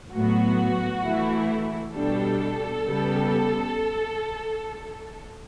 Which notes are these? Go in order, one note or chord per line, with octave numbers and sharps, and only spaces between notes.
A2 F#3 B3 F#4
E3 A3 E4
B2 G3 D4 A4
C#3 G3 B3